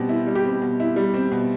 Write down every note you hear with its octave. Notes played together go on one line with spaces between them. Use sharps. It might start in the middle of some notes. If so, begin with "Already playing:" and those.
Already playing: B2 G3 C4 G4
E4
G3
G4
C4
B2
E4
G3
C4
B2